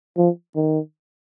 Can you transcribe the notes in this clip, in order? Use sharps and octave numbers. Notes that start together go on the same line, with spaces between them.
F3
D#3